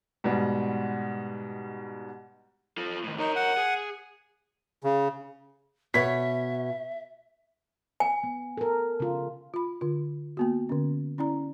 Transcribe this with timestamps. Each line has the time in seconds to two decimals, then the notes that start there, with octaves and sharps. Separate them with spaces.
0.24 G#2 B2 G3
2.77 F4 A4
3.04 A2 D#3
3.19 D#4 A#4 C#5
3.36 F#5
3.57 G#4
4.84 C#3
5.94 B2 C#5 E5 B6
8.00 G#5
8.23 B3
8.57 A4 A#4
9.00 C#3 F4
9.54 F4 B5
9.81 D3 F4
10.37 A#3 B3 F#4
10.69 D3 C#4
11.18 C#4 E4 D5 A#5